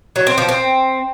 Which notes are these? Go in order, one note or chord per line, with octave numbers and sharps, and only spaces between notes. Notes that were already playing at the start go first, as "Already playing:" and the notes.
F#3
C4
F3
C4